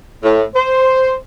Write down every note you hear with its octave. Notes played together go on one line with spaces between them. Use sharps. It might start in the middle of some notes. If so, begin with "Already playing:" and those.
A2
C5